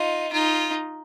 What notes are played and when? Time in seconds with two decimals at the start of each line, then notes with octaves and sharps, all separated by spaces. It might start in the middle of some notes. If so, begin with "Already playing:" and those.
Already playing: D#4 F4
0.32 D#4 F4